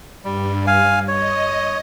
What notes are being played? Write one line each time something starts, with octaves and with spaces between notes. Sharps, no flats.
G2 G3
F5 G#5
C#5 D#5